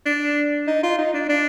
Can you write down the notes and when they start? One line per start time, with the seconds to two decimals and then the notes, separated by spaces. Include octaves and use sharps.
0.06 D4
0.67 D#4
0.83 F4
0.98 D#4
1.14 D4
1.29 D4